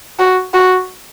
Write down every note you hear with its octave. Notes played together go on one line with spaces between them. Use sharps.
F#4
F#4